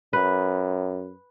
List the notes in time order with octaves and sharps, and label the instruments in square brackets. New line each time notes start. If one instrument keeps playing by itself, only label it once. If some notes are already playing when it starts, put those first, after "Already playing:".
[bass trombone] F#2 [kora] B4